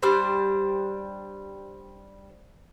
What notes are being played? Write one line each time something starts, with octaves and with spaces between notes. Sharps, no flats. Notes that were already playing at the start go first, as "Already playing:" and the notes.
G3 D4 C5